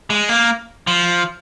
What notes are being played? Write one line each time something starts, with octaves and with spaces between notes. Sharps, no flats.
G#3
A#3
F3